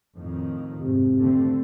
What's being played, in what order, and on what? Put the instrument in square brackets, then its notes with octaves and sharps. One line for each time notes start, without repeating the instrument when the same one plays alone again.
[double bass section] F2 A2 D#3
[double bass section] G#2 [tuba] C3
[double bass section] D3 A3 C4